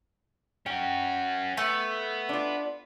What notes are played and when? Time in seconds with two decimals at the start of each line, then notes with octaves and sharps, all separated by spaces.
0.66 C#4 F#4 G5
1.57 A3 B3
2.29 D4 F4